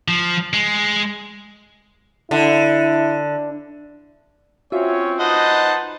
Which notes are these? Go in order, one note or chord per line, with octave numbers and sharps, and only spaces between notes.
F3
G#3
D3 E4
C4 C#4 F4 F#4 C#5 E5
D#4 B4 C5 D#5 F#5 A5